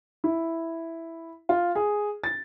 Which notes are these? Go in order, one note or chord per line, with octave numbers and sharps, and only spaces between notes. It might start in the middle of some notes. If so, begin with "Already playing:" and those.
E4
F4
G#4
A6